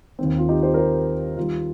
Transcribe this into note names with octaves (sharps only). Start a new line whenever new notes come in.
D#2 D#3 C4
F4
D#4 G4
G4 C5
A#4
G4 C5
D#2 D#3 G3 F4